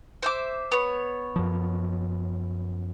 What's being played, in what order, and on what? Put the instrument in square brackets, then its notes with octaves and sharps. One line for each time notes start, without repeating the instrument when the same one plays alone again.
[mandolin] C5 E5 D6
B3 C#5
[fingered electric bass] F#2 F3